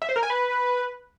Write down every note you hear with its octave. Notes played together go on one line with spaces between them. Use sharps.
E5
C5
A#4
G#5
B4